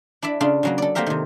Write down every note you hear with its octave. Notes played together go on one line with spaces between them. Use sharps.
D4 E4 D5 E5
C#3 D4 F4
C#3 F#3 A#3
A4 D5
A3 A#3 C4 G4 A#4 E5
C3 D#3